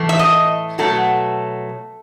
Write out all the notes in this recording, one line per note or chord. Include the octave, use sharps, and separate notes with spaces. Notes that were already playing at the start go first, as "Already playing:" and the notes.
Already playing: A2 E3 A3
E5
D#5
B2 F#3 A3 A4